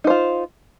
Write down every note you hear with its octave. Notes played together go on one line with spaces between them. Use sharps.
D#4 F4 C5